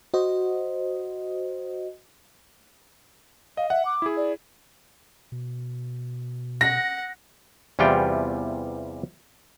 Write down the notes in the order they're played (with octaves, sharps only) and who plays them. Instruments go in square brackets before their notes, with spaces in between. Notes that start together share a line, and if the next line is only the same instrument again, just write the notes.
[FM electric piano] F#4 C5 D#5
[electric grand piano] D#5 [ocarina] F5
[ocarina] E5 [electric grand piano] F#5
[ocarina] D6
[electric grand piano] E4 G#4
[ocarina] D5
[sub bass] B2
[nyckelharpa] F#5 [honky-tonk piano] A#6
[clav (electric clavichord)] E2 C3 E3 G3 F4 G5